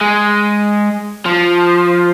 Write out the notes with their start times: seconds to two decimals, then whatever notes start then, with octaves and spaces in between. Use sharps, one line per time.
0.01 G#3
1.26 F3